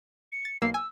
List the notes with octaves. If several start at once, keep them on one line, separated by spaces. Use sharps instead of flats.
C#7
A6
B1 A#3 E6 C7
G#5 E6